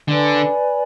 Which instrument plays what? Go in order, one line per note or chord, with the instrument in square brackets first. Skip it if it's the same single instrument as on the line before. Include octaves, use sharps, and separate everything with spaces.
[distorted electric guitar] D3 [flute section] B4 D5 G#5 B5